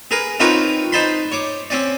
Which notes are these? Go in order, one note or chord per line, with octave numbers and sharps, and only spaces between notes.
G#4 A#4 B4
C4 D#4 F4 A#4 B4 C#5
D#4 C5 A5 B5 C6
C#5 D6
C4 C#4 D5